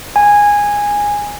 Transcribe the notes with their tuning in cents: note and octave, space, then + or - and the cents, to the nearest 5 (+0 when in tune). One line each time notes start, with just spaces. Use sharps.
G#5 -10